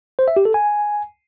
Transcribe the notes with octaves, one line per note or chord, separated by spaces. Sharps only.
C5
E5
G4
A4
G#5